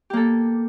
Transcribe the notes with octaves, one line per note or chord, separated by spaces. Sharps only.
A#3 G4 A4